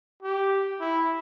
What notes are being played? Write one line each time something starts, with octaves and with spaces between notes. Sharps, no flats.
G4
E4